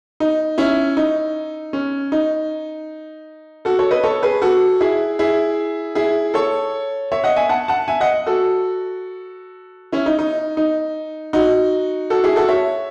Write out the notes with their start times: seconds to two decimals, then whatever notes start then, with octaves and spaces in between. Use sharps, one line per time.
0.20 D#4
0.58 C#4 E4
0.97 D#4
1.73 C#4
2.12 D#4
3.65 F#4 A4
3.79 A4 C#5
3.91 B4 D#5
4.04 A4 C#5
4.23 G#4 B4
4.42 F#4 A4
4.81 E4 G#4
5.19 E4 G#4
5.95 E4 G#4
6.34 A4 C#5
7.12 C#5 E5
7.24 D#5 F#5
7.36 E5 G#5
7.49 F#5 A5
7.68 F#5 A5
7.88 E5 G#5
8.01 D#5 F#5
8.27 F#4 A4
9.93 C#4 E4
10.06 D#4
10.19 D#4
10.57 D#4
11.33 D#4 F#4
12.10 F#4 A4
12.24 E4 G#4
12.36 F#4 A4
12.48 C#5 E5